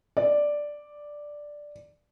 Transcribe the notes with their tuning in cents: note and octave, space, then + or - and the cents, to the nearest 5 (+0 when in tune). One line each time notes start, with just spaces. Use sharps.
D5 +0